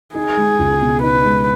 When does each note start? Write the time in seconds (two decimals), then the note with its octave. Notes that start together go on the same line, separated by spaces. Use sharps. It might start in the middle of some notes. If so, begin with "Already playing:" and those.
0.15 D#4 G#4
0.37 G#3
0.59 C#2
0.82 B2
1.03 D#4 B4
1.25 G#3